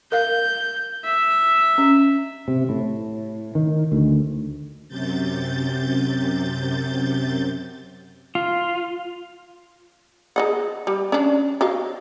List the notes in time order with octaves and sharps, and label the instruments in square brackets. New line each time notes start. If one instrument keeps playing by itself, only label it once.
[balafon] A#4 F5 [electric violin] G6
[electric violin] E5
[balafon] C#4
[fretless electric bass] C3
A2
D#3
D2
[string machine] F#2 C3 G6 A6
[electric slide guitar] F4
[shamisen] G#4 D#5 F#5
G3
C#4 D4
F#4 D#5 F5